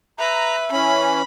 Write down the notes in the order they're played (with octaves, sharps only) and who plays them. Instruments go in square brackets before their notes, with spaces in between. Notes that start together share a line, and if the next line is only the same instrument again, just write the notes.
[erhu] B4 [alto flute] E5 [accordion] A#5
[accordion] E3 C#4 [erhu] B5